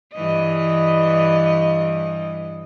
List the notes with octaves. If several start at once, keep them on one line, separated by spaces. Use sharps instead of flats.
G2 E3 D#5